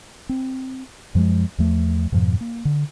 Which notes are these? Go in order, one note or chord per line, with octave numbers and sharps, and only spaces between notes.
C4
F#2 F3 G3 G#3
E2 F3 A3
F2 G#2 B2 F3
A#3
D3